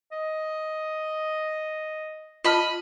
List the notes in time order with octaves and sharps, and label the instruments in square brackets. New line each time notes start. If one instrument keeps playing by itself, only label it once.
[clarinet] D#5
[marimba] F4 A5 F6 [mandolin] D#5 B5